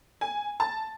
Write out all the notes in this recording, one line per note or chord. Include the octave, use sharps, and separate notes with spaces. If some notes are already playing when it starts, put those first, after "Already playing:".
G#5
A5